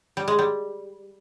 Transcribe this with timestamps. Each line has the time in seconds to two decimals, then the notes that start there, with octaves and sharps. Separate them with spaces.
0.17 G3
0.28 G#3
0.39 G3